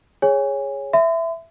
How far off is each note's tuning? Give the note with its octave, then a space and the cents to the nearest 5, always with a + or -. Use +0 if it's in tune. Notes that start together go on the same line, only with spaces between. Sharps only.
G#4 +0 C#5 +0 G#5 -20
E5 +5 C6 -45